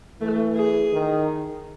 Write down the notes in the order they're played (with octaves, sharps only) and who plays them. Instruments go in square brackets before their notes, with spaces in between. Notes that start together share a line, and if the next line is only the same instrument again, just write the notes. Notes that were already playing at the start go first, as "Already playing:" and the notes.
[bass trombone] E3 [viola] A3
[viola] G#4
[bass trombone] D#3